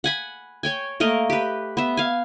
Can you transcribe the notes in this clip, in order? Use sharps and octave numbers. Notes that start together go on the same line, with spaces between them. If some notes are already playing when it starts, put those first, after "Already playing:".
F#5 G#5 B5
C#5 G5 G#5
A3 A#3 A#4 D#5
G4 B4
B3 E5
F5 G#5